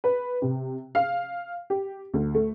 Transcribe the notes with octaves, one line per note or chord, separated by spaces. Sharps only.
B4
C3
F5
G4
D2
A3